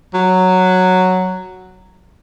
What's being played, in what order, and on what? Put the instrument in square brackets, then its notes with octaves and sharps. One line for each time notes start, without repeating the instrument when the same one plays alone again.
[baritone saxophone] F#3